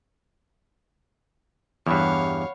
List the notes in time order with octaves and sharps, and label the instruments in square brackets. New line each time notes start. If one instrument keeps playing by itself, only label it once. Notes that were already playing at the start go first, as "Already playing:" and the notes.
[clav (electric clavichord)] E2 G2 [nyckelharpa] C#5 F5 [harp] F#5 B5 F6